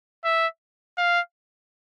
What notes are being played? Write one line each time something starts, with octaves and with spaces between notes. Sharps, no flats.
E5
F5